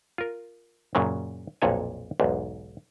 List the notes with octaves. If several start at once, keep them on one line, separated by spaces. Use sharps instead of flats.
F4 A#4
F#2 A#2 C#3 F#3
B1 F2 A#2 A4 C#5 G#5
B1 E2 G#2